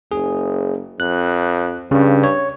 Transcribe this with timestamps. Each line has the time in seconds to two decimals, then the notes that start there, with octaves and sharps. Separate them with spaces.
0.12 F#1 G#4
1.00 F2 F#6
1.91 G2 C#3
2.24 C#5